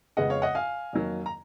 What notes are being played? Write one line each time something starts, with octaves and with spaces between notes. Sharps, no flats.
F2 C#3 G#3 B3 D#5 F#5
C#5 F5
D#5 F#5
F5 G#5
F2 D#3 F#3 A#3
A#5